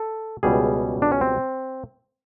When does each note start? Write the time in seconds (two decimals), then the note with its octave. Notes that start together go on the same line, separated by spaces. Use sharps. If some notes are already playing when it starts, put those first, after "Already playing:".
Already playing: A4
0.43 C#2 B2 G3 G#4
1.02 D4
1.12 C#4
1.21 C4